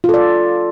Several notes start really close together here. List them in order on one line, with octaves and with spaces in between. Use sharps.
F4 A4 D5